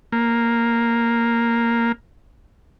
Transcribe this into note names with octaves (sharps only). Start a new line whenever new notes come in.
A#3